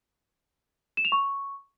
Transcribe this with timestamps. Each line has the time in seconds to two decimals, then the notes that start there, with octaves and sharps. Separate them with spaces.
0.97 E7
1.05 F7
1.12 C#6